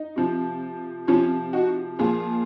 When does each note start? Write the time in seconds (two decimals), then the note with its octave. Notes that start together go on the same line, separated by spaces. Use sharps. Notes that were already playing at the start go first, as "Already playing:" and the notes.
Already playing: D#4
0.16 C3 F3
1.07 C3 F3 C#4 F4
1.53 D#4 F#4
1.99 A#2 F3 F4 G#4